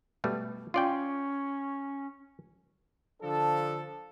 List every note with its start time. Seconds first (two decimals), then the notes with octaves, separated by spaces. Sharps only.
0.24 B2 G3 A3
0.74 C#4 F4 D5 G5
3.21 D3 F3 D4 A4